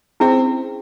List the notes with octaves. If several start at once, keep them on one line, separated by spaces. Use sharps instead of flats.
C4 C#4 E4 G#4